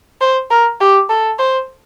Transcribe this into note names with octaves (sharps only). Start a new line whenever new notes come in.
C5
A#4
G4
A4
C5